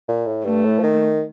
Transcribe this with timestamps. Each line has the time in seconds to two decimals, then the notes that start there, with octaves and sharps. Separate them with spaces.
0.08 A#2
0.26 A2
0.45 G2 A3
0.65 A2
0.79 F3
0.83 D#3